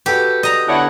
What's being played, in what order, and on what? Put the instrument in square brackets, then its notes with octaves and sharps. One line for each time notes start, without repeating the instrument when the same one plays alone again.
[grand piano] F#4 A4 B4 [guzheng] G4
[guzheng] D#5 A#5
[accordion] D3 B3 E4 [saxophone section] D4 C#5 F#5